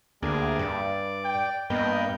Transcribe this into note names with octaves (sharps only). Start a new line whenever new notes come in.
D2 G3 A#3 D4 G#4
G2 D5
G5
G2 A#3 B3 D#5 G5